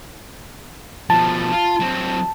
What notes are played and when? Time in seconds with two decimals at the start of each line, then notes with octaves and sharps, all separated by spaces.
1.10 B2 F3 A5
1.52 F4
1.80 F#3 C4